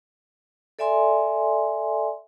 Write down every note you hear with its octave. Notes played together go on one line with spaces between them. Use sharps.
A4 D5 E5 G#5 C6